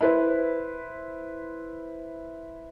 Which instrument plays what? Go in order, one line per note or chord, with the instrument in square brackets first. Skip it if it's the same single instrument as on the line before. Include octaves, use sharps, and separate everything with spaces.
[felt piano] E4 B4 C5